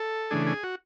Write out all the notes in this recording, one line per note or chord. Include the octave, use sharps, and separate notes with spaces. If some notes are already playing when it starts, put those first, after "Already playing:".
Already playing: A4
C#3 E3 A3 D4 G#4
G#4
F#4